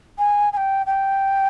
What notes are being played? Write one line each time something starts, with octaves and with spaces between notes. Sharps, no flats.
G#5
G#5
G5
G5